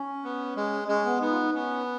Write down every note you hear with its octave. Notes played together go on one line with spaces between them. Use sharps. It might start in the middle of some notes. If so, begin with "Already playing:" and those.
Already playing: C#4
B3
G#3
G#3 C#4
B3
B3 D#4
F4
D#4
B3 C#4